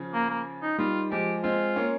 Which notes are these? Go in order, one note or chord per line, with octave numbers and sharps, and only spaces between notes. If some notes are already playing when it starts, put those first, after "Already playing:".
Already playing: C#3 F3
A#3
A#3
D#4
D#3 G3 F4
F3 G#3 G4
G#3 C4 F4
A#3 C#4